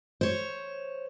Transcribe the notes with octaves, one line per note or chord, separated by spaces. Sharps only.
C5 C#5